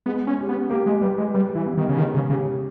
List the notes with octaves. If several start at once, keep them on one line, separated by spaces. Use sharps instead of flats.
G#3 B3
C#4
G4
B3
A#3 G4
G#3
G3 B4
G#3
G3 B4
E3
B3
D#3
C#3
D#3 G#3
C#3
C#3 G4